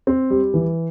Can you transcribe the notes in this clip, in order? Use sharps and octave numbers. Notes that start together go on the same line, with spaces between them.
C4
G3
E3